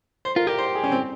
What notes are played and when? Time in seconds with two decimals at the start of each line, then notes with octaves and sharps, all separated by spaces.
0.25 C5
0.36 F4 A#4
0.47 G4 A#4
0.58 C5
0.75 G#4
0.84 C#4
0.92 C4